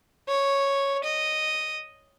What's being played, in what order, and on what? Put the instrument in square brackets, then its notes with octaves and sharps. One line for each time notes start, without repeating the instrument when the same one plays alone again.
[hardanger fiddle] C#5
D#5